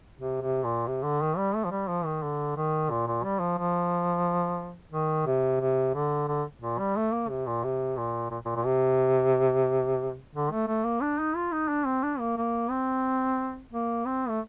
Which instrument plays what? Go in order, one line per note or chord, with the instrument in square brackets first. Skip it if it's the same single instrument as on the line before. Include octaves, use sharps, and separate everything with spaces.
[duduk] C3
C3
A#2
C3
D3
D#3
G3
A3
F3
G3
F3
D#3
D3
D#3
A#2
A#2
G3
F3
F3
D#3
C3
C3
D3
D3
A#2
G3
A3
A#3
C3
A#2
C3
A#2
A#2
A#2
A#2
C3
D3
A3
A3
A#3
D4
D#4
F4
D#4
D4
C4
D4
A#3
A#3
C4
A#3
C4
A3